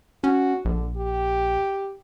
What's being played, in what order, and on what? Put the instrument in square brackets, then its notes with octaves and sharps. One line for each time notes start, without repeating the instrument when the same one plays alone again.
[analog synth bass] C#4 [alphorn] F#4
[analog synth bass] A#1 [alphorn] D3
[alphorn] G4